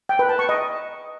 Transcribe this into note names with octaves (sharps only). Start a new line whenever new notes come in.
G5
B4
A5
C#6
D#5